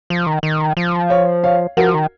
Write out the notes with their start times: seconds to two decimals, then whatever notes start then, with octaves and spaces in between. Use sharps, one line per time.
0.10 F3
0.27 D#3
0.43 D#3
0.77 F3
1.10 C#5 F5
1.44 C#5 F5
1.77 F3 F#4 A#4
1.94 D#3